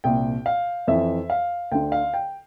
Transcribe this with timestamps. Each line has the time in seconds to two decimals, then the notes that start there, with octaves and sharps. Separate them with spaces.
0.04 C2 A#2 G5
0.46 F5
0.87 F2 E3 E5
1.30 F5
1.71 D2 D3 G5
1.92 F5
2.14 G5